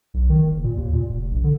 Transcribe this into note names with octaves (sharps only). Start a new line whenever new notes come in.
B1
D#3
F#1
A#2
D#2
A#2
F1
A#1
D3